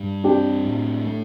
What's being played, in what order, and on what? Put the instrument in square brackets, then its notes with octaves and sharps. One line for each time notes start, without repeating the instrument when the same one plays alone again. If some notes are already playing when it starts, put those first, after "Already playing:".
Already playing: [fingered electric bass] G2
[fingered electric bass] C4 [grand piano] D4 G4
[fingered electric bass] A2
A3